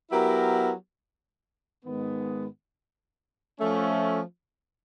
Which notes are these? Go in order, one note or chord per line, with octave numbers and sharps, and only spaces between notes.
F#3 B3 E4 G4 A#4
G#2 D#3 G#3 B3
F3 A3 C#4